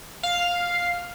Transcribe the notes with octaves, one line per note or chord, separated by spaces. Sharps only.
F5